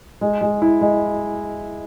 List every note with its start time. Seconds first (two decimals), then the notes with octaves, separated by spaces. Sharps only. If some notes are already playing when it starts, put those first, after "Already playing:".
0.21 G#3
0.41 G#3
0.62 E4
0.81 G#3